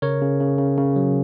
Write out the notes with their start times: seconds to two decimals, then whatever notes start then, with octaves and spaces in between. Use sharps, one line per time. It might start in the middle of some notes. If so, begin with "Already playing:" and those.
0.02 C#3 A#4 C#5
0.22 C#3
0.40 C#3
0.59 C#3
0.78 C#3
0.96 F#3